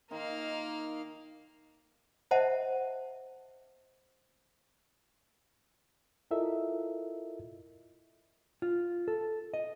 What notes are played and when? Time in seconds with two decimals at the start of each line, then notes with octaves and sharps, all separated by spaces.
0.11 D#3 A#3 D#4 F4 F5
2.31 C5 D#5 E5 F#5 A5
6.31 E4 F4 A4 A#4 D#5 E5
8.62 F4
9.08 A4
9.54 D#5